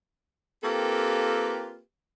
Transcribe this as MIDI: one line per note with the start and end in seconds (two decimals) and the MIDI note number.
0.64 1.79 58
0.64 1.79 60
0.64 1.79 65
0.64 1.79 67
0.64 1.79 69
0.64 1.79 71